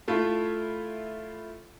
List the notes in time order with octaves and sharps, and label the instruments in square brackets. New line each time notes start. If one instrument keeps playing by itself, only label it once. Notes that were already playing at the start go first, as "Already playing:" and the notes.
[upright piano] A3 E4 F4